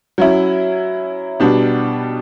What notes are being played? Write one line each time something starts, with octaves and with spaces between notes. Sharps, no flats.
F#3 C#4 E4
B2 G3 B3 D4 G4